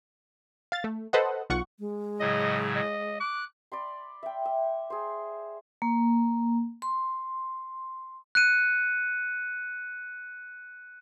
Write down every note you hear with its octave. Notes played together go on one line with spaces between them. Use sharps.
F5 A6
A3
A4 B4 C5 D#5 F#5
B1 F4 F#5 C#6
G#3
A2 C#3 F#3 D#5
D#5
D6 F#6
D5 B5 C6
E5 G5
E5
G#4 C5
A#3
C6
F#6 C#7 D#7